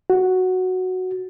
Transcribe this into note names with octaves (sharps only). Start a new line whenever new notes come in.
F#4